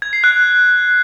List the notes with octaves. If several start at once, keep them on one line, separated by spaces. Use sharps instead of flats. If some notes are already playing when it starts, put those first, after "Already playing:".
G#6
C7
F#6